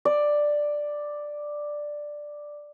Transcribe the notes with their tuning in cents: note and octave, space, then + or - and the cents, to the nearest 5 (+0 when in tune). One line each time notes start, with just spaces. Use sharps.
D5 +5